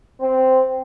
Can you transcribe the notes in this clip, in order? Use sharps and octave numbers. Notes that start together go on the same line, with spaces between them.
C4